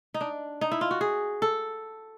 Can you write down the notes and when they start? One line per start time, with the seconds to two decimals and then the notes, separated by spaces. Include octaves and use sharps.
0.14 D#4
0.21 D4
0.61 D#4
0.72 E4
0.81 F4
0.91 F#4
1.01 G#4
1.42 A4